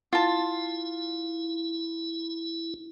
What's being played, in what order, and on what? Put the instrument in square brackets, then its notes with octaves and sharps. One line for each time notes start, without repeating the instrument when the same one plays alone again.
[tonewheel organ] E4 [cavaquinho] F4 A5